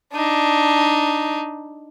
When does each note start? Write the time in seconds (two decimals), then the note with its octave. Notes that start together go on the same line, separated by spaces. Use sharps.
0.13 D4 D#4